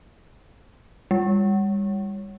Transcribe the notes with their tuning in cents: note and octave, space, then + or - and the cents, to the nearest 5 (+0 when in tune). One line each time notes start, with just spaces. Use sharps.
G3 +35